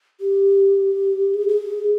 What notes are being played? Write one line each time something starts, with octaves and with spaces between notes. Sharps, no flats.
G4
G#4
G#4